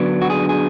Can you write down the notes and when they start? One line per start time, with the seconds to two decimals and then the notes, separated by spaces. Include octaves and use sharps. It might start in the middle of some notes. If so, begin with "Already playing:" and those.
Already playing: D3 F#3 B3 D4
0.22 F#4
0.30 G#4
0.49 G#4